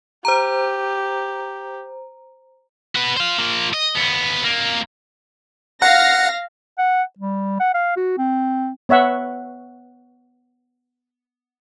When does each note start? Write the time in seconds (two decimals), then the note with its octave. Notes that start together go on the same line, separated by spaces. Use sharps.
0.25 G4 C5 A#5
2.95 F#4 B4
3.17 C5 F5
3.38 F3 A#3
3.73 D#5
3.95 D#2 B3
4.44 F2 A#3
5.82 F5 F#5 A#6
6.78 F#5
7.19 G3
7.60 F#5
7.74 F5
7.97 F#4
8.18 C4
8.89 B3 C#5 E5 F#5